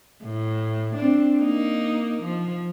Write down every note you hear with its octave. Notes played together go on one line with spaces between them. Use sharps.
A2
C4 D4
A#3 D#4
F3